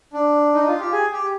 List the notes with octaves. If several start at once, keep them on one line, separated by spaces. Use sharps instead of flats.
D4
D#4
F4
G4
G#4
G4